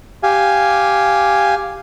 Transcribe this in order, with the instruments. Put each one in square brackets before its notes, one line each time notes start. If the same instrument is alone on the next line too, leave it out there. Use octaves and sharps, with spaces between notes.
[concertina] G4 F5 G#5